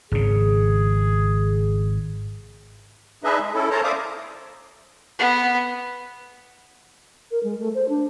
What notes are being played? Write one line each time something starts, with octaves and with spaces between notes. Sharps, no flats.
G#1 C#3 G#4
D4 D#4 G#4 B4 D#5 E5
G#3
C#4 E4 A4
A4 A#4 C5 C#5 A5 A#5
C5 D5 E5 F5 D6 D#6
B3
A#4
G#3
A3
C5
D4